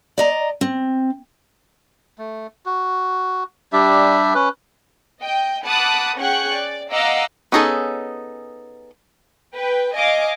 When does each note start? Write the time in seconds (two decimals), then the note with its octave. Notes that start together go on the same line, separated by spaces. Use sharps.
0.18 D5 D#5 A#5
0.61 C4
2.18 A3
2.66 F#4
3.73 G3 D4 G4 E5
4.34 C#4 B4
5.21 D#5 G5
5.64 F#5 A5 B5 D6 D#6 F#6
6.19 C#4 G#4 F#5 G5 C#6 F#6
6.52 D5
6.91 D#5 F5 F#5 A#5 D6 E6
7.52 B3 C#4 D#4 G#4 A4
9.55 B4 G5
9.96 D#5 F5 G#5 D6